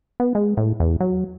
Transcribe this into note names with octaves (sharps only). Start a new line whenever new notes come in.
B3
G#3
A2
E2
F#3